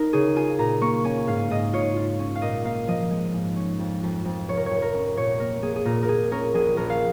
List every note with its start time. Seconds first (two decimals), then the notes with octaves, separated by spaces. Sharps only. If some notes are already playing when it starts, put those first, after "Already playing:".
Already playing: D#4 A#4
0.13 C#3 G#4
0.36 F4 G#5
0.59 A#2 A#5
0.81 A#3 C#6
1.04 C#4 G#5
1.27 G#2 F5
1.50 G#2 D#5
1.73 F4 C#5
1.97 F4
2.19 C#4
2.35 F5
2.42 A#2 D#5
2.64 A#3 F5
2.87 F3 D#5
3.11 G#3
3.33 G#2
3.56 C#4
3.79 F2
4.03 F2
4.25 F2
4.48 F1 C#5
4.57 A#4
4.66 C#5
4.71 F1
4.82 A#4
4.94 C#4
5.17 A#2 C#5
5.40 A#3 A#4
5.62 A#3 G#4
5.76 G#4
5.85 A#2 A#4
6.03 A#4
6.08 A#2 G#4
6.31 C#4 A#4
6.54 A#1 G#4
6.77 A#1 A#4
6.90 F5